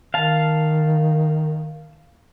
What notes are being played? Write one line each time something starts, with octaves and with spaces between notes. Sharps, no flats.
D#3 F5 A5